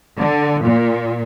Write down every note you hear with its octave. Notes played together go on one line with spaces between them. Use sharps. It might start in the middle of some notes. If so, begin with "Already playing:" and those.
D3
A#2